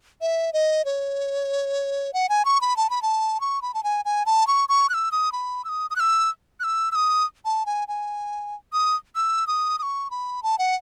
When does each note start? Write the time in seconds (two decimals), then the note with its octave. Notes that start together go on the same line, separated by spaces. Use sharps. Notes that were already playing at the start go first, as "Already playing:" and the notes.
0.21 E5
0.53 D#5
0.85 C#5
2.14 F#5
2.29 G#5
2.45 C#6
2.61 B5
2.77 A5
2.90 B5
3.02 A5
3.41 C#6
3.62 B5
3.74 A5
3.84 G#5
4.05 G#5
4.26 A5
4.47 C#6
4.69 C#6
4.89 F#6
4.94 E6
5.12 D#6
5.32 B5
5.65 E6
5.69 D#6
5.90 D#6
5.96 F#6
6.00 E6
6.60 F#6
6.64 E6
6.92 E6
6.95 D#6
7.45 A5
7.66 G#5
7.88 G#5
8.73 D#6
9.15 E6
9.47 D#6
9.79 D#6
9.83 C#6
10.11 B5
10.43 A5
10.59 F#5